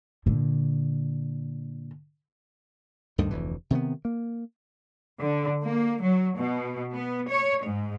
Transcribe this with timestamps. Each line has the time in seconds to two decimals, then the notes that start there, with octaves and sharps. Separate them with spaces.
0.26 A#2 D3
3.18 D2 G2 D3 D#3
3.31 F1 D2 E3
3.71 C3 D#3 G3 B3
4.05 A#3
5.19 D3
5.64 A#3
6.01 F#3
6.37 B2
6.94 B3
7.28 C#5
7.65 G#2